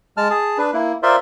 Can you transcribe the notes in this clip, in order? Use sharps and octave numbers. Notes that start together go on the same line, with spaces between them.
G#3 A5 F6
G#4 A5
D4 B4
A#3 E4
F4 A#4 C5 D5 E5 C6